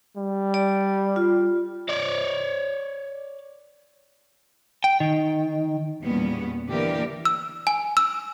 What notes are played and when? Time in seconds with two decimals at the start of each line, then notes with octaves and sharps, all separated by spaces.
0.17 G3
0.54 D5
1.16 F4
1.89 C#5 D5
4.84 G5
5.00 D#3
6.02 E2 A#2 G3 B3 C#4
6.69 D3 E3 A#3 G4 A#4 D5
7.25 E6
7.67 G#5
7.97 E6